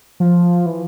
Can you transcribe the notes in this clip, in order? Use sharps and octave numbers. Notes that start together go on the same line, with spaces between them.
F3
E3